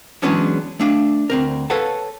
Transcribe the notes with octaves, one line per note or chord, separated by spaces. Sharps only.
E3 F#3 G#3 B3 C#4 D4
A3 D4 F5
D2 C4 A#4
A4 B4 C#5 F5 F#5 A5